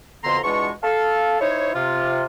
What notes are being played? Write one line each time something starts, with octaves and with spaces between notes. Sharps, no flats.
F2 B2 D3 B3 A#5 C6
E2 B2 G#3 D4 F4 C#6
A4 F5
D#4 E4 C5 C#5
C3 F4